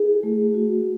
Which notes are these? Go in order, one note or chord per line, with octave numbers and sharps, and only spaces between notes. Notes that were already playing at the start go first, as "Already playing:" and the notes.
Already playing: E4 G#4
A3
F#4